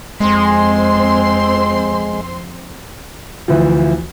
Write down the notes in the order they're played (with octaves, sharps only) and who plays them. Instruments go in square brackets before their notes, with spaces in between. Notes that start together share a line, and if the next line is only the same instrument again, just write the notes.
[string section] F2 C4 C6 [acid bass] G#3
[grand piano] D2 E3 F3